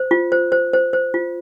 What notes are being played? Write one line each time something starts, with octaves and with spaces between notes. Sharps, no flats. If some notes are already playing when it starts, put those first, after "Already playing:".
Already playing: C5
F4
C5
C5
C5
C5
F4